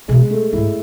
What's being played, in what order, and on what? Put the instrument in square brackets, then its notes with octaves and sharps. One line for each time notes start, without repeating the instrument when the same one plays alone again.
[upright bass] B2 [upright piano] G#3
[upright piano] A3
[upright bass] G#2 [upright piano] E4